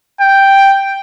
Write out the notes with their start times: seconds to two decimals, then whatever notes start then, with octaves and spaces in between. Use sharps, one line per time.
0.21 G5